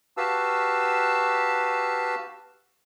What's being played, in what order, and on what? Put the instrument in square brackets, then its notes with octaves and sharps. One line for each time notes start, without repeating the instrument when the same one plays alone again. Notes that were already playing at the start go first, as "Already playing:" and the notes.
[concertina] F#4 G4 B4 F5 A5 E6